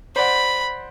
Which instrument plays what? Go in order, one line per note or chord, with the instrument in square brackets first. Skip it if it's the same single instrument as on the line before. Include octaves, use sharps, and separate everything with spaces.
[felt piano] C5 D5 F#5 [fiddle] B5